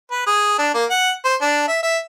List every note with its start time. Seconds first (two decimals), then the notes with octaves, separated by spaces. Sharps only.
0.11 B4
0.26 G#4
0.58 D4
0.74 A#3
0.90 F#5
1.25 C5
1.41 D4
1.68 E5
1.83 E5